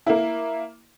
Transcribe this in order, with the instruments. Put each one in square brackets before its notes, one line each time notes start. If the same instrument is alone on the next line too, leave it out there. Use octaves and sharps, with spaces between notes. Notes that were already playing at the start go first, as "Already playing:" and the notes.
[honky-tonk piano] A#3 E4